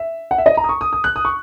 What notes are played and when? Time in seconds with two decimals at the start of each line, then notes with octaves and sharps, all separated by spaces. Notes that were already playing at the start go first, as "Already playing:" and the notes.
Already playing: E5
0.31 F#5
0.38 E5
0.46 D#5
0.57 A#5
0.64 D#6
0.69 C#6
0.81 D#6
0.93 D#6
1.04 F#6
1.16 D#6
1.25 C#6